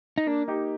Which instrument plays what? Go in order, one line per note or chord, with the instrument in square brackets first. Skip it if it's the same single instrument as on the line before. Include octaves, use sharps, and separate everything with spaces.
[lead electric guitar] D#4
[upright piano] A#3 [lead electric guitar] D4
[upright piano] D#4 G4